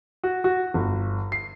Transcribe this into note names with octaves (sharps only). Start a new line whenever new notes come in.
F#4
F#4
G1
C7